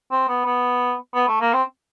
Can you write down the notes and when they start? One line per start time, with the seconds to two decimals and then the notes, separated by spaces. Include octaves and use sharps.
0.11 C4
0.29 B3
0.45 B3
1.14 B3
1.28 A3
1.41 A#3
1.53 C4